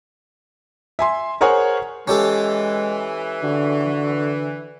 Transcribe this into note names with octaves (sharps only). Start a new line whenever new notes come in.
E5 G#5 C6
G#4 A#4 C5 C#5 F#5 G#5
E3 G#3 C#4 G4 A4
D3 F#4